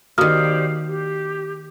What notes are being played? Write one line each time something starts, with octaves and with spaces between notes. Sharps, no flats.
D#3 A#3 F#4 G4 C5 D5 D#6 F6
G4